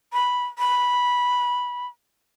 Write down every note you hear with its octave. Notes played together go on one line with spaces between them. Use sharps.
B5
B5